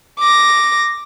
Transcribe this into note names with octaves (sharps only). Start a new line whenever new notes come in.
D6 A#6